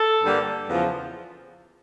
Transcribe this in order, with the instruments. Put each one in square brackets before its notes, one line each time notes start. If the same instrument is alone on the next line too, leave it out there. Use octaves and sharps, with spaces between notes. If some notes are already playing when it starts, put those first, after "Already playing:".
Already playing: [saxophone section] A4
G2 D3 G3 A#3
E2 C#3 F3